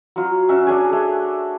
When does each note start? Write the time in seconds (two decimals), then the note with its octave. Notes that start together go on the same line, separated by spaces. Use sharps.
0.16 F#3 F4
0.49 C#4 F#4 E5
0.67 D4 G#4 G#5
0.89 A3 G#4